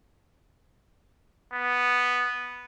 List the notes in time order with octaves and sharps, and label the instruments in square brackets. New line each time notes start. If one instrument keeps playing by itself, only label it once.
[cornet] B3